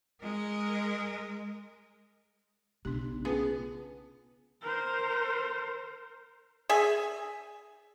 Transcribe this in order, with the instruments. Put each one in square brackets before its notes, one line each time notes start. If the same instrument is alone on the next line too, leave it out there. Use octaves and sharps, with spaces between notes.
[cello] G#3 A#4
[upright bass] B1 C#3 [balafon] D4 G4
[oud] B3 [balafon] C#4 F4 A5 [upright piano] G#4
[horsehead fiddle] A#4 C5
[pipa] G#4 E5 G#5